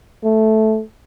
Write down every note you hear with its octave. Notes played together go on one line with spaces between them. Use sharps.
A3